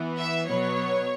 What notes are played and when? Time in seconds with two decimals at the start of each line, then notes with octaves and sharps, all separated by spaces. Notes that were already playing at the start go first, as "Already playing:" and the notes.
Already playing: E3 B3
0.18 E5
0.46 B2 F#3 B3 C#5